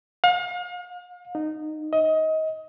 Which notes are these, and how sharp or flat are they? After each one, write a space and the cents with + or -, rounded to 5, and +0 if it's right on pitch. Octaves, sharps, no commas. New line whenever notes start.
F5 +40
D#4 -15
D#5 +25